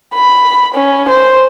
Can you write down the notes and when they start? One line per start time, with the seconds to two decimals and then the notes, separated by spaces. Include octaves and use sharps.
0.14 B5
0.75 C#4
1.09 C5